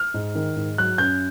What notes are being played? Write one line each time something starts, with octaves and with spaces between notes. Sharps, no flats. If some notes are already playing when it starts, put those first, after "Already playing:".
Already playing: F6
G#2
D#3
G#2
F#3 F#6
F#2 G6